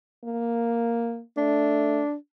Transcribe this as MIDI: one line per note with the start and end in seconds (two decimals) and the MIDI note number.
0.24 1.21 58
1.37 2.02 57
1.37 2.14 62